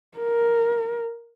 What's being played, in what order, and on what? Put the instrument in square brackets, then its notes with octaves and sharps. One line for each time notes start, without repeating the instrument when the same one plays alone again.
[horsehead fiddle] A#4